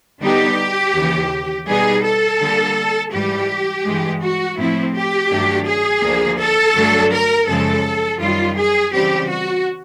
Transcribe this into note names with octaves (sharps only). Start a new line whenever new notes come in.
D3 G3 B3 D#4 G4
D#2 C#3 E3
B2 G3 B3 D#4 G#4
A4
D3 G3 A#3
G#2 E3 G3 G4
G2 E3 G#3
F#4
A2 F3 A3 C4 E4
G4
G2 D#3 F#3 A3 D4
G#4
D2 D3 F3 A#3
A4
G2 D3 F#3 A3 D4
A#4
F#2 C#3 F3 G#3 A4
F#2 D#3 G3 F4
G#4
C#3 E3 G3 C4 G4
F#4